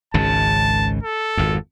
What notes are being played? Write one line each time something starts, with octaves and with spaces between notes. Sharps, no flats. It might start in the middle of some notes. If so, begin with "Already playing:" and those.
G#1 C#2 C#3 A5
A4
G#1 F2